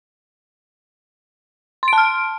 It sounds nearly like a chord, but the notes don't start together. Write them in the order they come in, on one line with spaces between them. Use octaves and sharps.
C6 D7 A5 F6